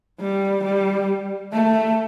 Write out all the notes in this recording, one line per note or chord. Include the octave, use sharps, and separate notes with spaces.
G3
G3
A3